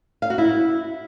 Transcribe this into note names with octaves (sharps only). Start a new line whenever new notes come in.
F5
F#4
E4